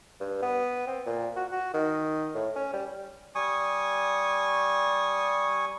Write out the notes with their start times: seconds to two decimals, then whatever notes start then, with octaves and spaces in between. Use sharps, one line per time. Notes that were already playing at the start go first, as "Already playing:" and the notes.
0.20 G2
0.42 B3
0.87 C4
1.06 A#2
1.36 F#4
1.52 F#4
1.74 D#3
2.34 A2
2.56 C#4
2.73 G3
3.35 G3 G#5 C#6 D#6